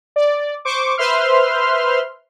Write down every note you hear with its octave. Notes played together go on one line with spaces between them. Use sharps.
D5
C5 C#6 D6
B4 C5 E5 C6 F6